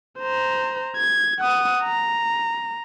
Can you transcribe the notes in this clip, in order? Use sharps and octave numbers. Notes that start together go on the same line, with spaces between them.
C5 A#5
G#6
F#5 D#6
A#5